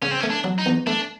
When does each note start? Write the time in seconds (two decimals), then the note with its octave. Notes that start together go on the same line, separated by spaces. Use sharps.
0.02 C#3 C#4
0.11 C4
0.20 C#4
0.23 A3
0.30 D4
0.44 F#3
0.59 D#4
0.66 E2
0.87 A3 D4